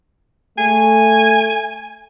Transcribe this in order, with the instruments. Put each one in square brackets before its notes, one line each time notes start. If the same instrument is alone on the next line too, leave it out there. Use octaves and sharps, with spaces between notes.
[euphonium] A3 [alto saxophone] G#5